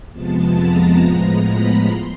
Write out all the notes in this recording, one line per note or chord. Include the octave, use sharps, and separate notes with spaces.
F2 C3 F3 G#3 B3 A5
A#5
A2 F3 G#3 B3 A#5
B5
C6